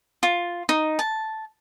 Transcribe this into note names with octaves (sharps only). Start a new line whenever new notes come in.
F4
D#4
A5